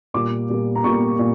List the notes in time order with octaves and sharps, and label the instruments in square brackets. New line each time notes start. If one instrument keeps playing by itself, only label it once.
[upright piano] A#2 G3 A#3 D6
A#2 G3 A#3
A#5
A#2 G3 A#3 C#6
A#2